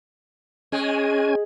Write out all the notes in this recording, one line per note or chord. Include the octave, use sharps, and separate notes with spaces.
G#3 C#4 G#5